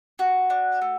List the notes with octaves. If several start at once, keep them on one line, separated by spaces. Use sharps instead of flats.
F#4
D4
A3